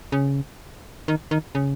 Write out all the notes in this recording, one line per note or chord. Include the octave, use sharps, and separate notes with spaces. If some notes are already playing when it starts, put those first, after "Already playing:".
C#3
D#3
D#3
C#3